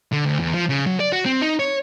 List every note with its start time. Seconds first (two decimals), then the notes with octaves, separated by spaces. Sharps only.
0.12 D3
0.25 D2
0.40 E2
0.54 F3
0.69 C#3
0.87 F#3
1.00 D5
1.12 F#4
1.25 C4
1.41 D#4
1.59 C#5